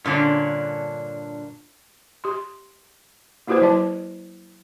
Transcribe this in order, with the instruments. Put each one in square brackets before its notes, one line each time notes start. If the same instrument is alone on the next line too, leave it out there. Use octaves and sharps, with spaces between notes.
[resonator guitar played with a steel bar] G2 A#2 D3 C#4 D4
[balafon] G4 C6
A#3 E4 F#4 G4 B4 C5
F#3 E4 D#5 A5